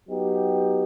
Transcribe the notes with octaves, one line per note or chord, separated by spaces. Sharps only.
F#3 B3 D#4 G4